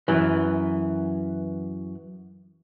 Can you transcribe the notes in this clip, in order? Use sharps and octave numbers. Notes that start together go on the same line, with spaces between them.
F#2 E3